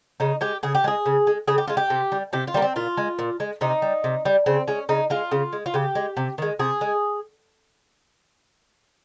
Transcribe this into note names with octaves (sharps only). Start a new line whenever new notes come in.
C#3 D#4
G#3 G4
C#3 G#4
G4
G#3 G#4
C#3
G#3
C#3 G#4
G4
G#3 F4
G4
C3
G3
C3 G4
F4
G3 A#3
C4
A#2 F4
G#3
A#2
G#3
C3 D#4
G3
C3
G3
C#3 C4
G#3 C#4
C#3 D#4
G#3 F4
C#3
G#3
F4
C#3 G4
G#3
C3
D#3 G#3
C3 G#4
G#3